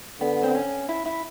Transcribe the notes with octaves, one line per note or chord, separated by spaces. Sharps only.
D3 B3
C4
C#4
E4
E4